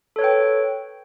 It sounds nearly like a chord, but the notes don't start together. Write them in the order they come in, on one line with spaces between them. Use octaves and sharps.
A4 C#5 B4 G5